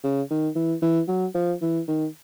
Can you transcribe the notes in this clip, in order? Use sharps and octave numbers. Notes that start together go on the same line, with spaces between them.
C#3
D#3
E3
E3
F#3
F3
E3
D#3